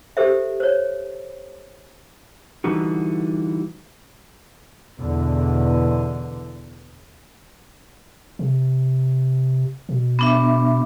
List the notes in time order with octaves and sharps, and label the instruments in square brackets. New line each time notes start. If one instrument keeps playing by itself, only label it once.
[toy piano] G4 A4 C5 E5
C5 C#5
[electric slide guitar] D3 E3 G3 D#4 F#4
[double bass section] E2 B2 D3
[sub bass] C3
B2
[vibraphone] B3 D4 E5